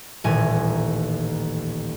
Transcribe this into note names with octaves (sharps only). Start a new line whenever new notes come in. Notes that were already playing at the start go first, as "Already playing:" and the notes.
D#1 A1 G#5